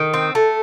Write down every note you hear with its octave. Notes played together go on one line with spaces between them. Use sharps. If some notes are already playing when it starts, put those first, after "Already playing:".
Already playing: D#3
C4
A3